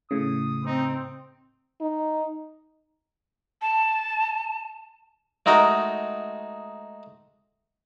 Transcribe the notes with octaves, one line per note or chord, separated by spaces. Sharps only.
A2 C#3 D#6
C4 D#4
D#4
A5
G#3 A3 D#4 F#4 A#4 D#5